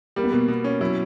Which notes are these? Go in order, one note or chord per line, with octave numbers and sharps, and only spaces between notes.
G3 A#3
B3
B2 A#3
B2
C#4
F#3 E4